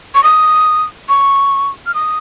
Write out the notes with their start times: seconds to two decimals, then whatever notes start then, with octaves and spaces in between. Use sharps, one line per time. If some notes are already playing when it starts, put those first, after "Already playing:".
0.15 C#6
0.23 D#6
1.09 C#6
1.86 F6
1.94 D#6